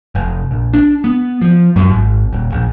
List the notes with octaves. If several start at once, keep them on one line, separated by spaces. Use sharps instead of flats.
F1
A#1
D4
B3
F3
F#2
G#1
D#1
A#1